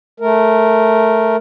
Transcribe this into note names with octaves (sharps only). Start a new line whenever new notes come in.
A3 A#4